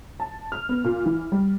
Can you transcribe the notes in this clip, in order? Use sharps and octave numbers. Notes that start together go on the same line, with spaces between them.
A5
F6
B3
A#2
E3
G3